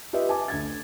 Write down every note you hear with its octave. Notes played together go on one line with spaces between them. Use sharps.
F4 G4 B4 D#5 E5
G#5 A5 D6
D2 G#6 A6